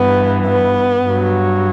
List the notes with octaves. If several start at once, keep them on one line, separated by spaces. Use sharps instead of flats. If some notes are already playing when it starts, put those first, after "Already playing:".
Already playing: G2 E3 B3
B3
G2 F#3